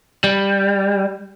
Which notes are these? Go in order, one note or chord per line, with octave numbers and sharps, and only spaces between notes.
G3